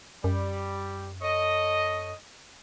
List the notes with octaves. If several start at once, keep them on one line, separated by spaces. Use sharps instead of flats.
F#2 G3
A4 C#5 D#5